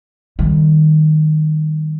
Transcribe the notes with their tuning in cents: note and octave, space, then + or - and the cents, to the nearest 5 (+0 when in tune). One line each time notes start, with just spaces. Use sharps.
D#3 -10 G3 +0